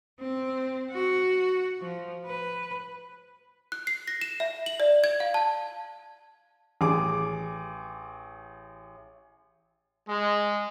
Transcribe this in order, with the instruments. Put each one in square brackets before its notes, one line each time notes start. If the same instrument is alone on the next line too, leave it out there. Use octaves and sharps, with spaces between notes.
[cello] C4
F#4
F3
B4
[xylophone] F#6
C7
A#6
E7
E5
F#7
D5
G#6
F5
A5
[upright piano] A1 G#4 D6
[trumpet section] G#3